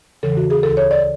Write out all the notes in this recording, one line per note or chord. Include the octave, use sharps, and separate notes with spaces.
E2 C#3 E3 A4
F#4
G#4
D2 C#3 E3 A4
C#5
D5